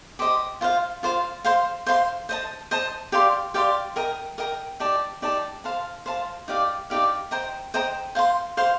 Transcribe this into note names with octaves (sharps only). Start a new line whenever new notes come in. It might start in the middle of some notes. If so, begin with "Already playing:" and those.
G4 C5 D#5
F4 C5 F5
F4 C5 F5
C5 F5 C6
C5 F5 C6
C5 D#5 A5
C5 D#5 A5
G4 D5 F5 C6
G4 D5 F5 C6
A#4 D#5 G5 A#5
A#4 D#5 G5 A#5
D#4 G4 D5 A5
D#4 G4 D5 A5
C5 F5 A5
C5 F5 A5
D#4 G4 D5 F5
D#4 G4 D5 F5
C5 D#5 G5 A#5
C5 D#5 G5 A#5
C5 F5 C6
C5 F5 C6